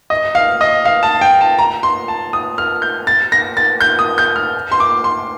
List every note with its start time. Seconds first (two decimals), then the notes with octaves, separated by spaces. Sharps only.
0.10 D#5
0.35 F5
0.61 D#5
0.85 F5
1.03 A5
1.21 G5
1.41 A5
1.59 A#5
1.83 C6
2.08 A5
2.33 D#6
2.58 F6
2.82 G6
3.07 A6
3.32 A#6
3.57 A6
3.81 G6
3.99 D#6
4.18 G6
4.36 F6
4.72 C6
4.80 D6
5.04 C6